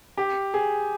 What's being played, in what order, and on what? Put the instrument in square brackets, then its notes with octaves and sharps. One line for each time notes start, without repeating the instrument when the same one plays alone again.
[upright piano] G4
G#4